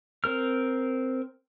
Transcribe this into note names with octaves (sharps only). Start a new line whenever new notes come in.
C4 A#4 F6